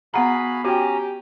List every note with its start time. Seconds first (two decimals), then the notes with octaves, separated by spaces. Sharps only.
0.14 B3 F#4 G#4 F5 F#5 A#5 B5
0.65 C#4 F#4 G4 G5 G#5 A#5